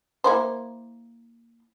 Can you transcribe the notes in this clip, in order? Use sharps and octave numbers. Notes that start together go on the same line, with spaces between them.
A#3 E4 C5